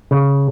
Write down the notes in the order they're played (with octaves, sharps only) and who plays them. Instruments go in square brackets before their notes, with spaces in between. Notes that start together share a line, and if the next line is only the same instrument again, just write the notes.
[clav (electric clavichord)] C#3